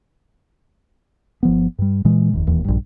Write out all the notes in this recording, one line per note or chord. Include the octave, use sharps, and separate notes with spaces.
G1 F3 B3
G2 G3
A#2 E3 G#3
F1 D#2
E1 D#2 E3
A#1 G2